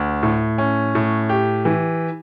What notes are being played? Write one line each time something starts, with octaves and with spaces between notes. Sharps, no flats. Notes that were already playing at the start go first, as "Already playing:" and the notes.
Already playing: D2
A2
C#4
A2
G4
E3